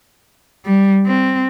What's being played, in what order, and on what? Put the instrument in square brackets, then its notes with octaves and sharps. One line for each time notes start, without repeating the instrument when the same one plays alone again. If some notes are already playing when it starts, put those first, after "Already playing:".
[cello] G3
C4